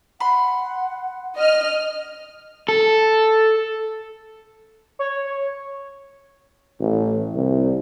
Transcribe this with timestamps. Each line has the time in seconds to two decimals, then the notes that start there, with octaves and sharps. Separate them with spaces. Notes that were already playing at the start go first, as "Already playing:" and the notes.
0.20 F#5 B5 C6
1.37 D#5 F6
2.68 A4
4.99 C#5
6.80 A1
7.33 C2